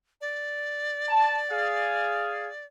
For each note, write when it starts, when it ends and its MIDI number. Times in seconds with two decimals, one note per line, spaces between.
0.21 2.66 74
1.09 1.37 81
1.51 2.49 68
1.51 2.49 77